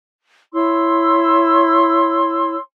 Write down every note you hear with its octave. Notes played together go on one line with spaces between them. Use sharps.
E4 C#5 C6 E6